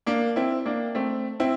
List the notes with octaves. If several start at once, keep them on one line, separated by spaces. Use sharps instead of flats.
A#3 D4
C4 E4
A#3 D4
A3 C4
C4 E4